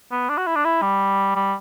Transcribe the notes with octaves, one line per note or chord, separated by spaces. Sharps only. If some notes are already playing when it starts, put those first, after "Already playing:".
B3
D4
F#4
E4
D4
E4
G3
G3